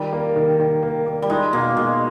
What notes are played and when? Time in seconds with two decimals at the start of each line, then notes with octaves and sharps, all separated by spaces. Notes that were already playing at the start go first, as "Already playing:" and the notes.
Already playing: D#3 G3
0.12 A#3
0.36 D#3
0.59 D#3
0.83 A#3
1.06 A#3
1.22 G3
1.30 G#3 D#4
1.53 B2 A#3
1.76 B2 G#3